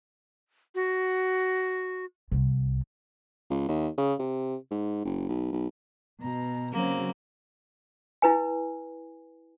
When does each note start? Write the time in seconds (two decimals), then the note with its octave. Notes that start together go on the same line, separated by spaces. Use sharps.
0.75 F#4
2.32 C2
3.50 C#2
3.68 D#2
3.97 C#3
4.19 C3
4.71 G#2
5.05 F#1
5.29 B1
5.52 B1
6.22 B2 A#5
6.73 C#3 F#3 A#3 C4
8.22 E4 B4 G#5